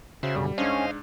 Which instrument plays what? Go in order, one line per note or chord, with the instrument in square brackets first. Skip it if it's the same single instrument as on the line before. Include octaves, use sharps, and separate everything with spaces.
[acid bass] C#3 [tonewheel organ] F#4 C5 E5
[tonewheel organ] F#2 B2 D3 [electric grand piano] G3
[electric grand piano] G#2 D4 [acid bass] C#4 [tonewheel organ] C5 D#5 F5